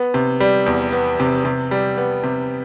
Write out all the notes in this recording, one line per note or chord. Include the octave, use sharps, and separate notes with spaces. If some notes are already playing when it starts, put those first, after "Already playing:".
Already playing: B3
C3
G3
E2
B3
C3
C3
G3
B3
C3